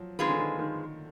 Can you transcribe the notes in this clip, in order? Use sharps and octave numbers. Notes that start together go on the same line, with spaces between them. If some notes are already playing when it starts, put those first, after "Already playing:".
Already playing: F3 F#3
D#3 G#3 C4 F4 G#4 B4
D3
D#3
D#3